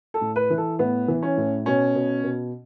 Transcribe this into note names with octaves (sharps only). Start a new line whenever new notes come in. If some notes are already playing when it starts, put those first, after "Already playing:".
A4
A2
B4
E3
A4
A2 B3
E3
C#4
A2
B2 C#4
B2
B2